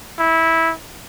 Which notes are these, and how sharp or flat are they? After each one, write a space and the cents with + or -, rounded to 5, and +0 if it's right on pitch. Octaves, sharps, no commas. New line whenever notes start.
E4 -15